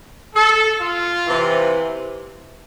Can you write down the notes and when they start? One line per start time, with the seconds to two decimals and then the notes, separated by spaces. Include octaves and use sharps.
0.35 A4
0.80 F4
1.24 C3 E3